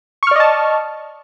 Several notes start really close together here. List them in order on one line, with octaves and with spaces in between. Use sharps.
C#6 F6 D5 D#5 A5